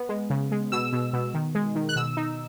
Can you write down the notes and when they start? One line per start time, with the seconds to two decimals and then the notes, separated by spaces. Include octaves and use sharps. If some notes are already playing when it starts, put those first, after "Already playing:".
Already playing: B3
0.09 G#3
0.30 C#3
0.52 G#3
0.72 B2 E6
0.93 B2
1.13 B2
1.34 D#3
1.55 G#3
1.75 D#3
1.89 F#6
1.96 B2 E6
2.17 D#4